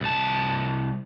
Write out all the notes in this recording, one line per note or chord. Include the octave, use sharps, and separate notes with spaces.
C2 A5